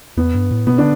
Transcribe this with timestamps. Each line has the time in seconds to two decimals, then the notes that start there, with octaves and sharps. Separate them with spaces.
0.17 E2 B3
0.34 G2
0.51 A2
0.67 B2 B3
0.78 D3 D4